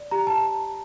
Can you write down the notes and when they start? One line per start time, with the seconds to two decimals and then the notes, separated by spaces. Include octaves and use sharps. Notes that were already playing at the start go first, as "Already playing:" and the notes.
Already playing: D5
0.11 G4 A#5
0.27 A5